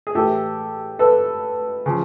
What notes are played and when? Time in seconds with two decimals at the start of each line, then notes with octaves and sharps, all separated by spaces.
0.07 G#4
0.15 A2 E3 G4 A4
0.99 A4 B4
1.86 C#3 F3